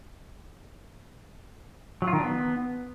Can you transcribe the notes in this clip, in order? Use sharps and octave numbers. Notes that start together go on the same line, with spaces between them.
F#3
F4
D#3
D4
B3